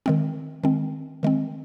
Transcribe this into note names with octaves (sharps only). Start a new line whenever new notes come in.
D#3 G#3 C4
D#3 G#3 C4
D#3 G#3 C4